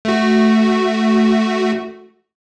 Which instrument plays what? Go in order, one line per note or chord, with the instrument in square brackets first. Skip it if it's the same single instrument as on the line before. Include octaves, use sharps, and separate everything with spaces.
[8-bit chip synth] A3 F#4